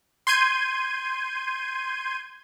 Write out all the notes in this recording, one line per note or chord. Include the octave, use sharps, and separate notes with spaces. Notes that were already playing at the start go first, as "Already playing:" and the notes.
C6 G6 G#6 D#7